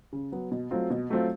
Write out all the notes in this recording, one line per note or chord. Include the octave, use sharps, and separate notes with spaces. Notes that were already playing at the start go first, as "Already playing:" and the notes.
C#3
F#3 B3
B2
F#3 A3 C4 F4
B2
F#3 A3 C4 F4